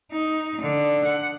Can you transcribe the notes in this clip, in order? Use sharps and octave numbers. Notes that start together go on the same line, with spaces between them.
D#4
D3
F#5